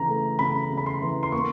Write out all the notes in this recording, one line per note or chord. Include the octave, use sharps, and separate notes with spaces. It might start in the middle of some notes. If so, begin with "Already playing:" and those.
Already playing: C#3 E3 A#5
A3
C#3 B5
C#3
B5
C6
E3
C6
A#3 C#6